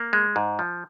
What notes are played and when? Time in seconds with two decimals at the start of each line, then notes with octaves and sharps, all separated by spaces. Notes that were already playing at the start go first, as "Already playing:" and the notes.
Already playing: A#3
0.13 G#3
0.36 G#2
0.59 F3